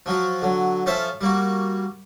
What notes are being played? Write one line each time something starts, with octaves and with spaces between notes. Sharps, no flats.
F3 F#3 F4 F#4
D3 F#3
F3 C#4 F4 A4 C5 E5
G3 A#3 F#4